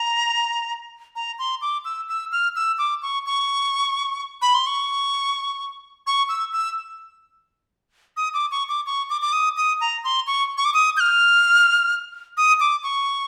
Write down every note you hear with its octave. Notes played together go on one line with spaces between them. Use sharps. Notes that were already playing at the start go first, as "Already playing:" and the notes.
Already playing: A#5
A#5
C6
D6
E6
E6
F6
E6
D6
C#6
C#6
B5
C6
C#6
C#6
E6
E6
D#6
D6
C#6
D6
C#6
D6
D6
D#6
D#6
A#5
C6
C#6
C#6
D6
D#6
G6
F6
D#6
D6
C#6